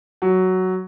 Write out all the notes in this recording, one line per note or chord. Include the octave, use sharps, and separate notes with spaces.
F#3